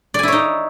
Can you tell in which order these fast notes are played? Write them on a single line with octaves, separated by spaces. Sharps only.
D5 G#5 E4 C#5 D#4